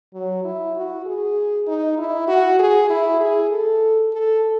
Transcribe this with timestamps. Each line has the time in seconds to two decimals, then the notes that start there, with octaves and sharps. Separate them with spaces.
0.14 F#3
0.44 E4
0.75 F#4
1.06 G#4
1.67 D#4
1.98 E4
2.28 F#4
2.59 G#4
2.90 E4
3.20 G#4
3.51 A4
4.13 A4